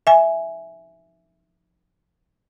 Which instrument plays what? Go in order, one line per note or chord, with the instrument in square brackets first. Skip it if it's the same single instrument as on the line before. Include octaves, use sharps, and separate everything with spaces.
[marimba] E5 G#5